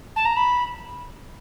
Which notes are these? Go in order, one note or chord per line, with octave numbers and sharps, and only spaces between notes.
A5
A#5
B5